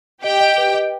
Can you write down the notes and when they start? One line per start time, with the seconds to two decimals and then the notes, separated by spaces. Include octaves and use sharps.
0.23 G4 D#5 G5
0.40 D#5
0.58 B4
0.74 D#5